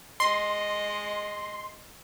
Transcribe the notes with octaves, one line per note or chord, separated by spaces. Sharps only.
G#3 D#5 C6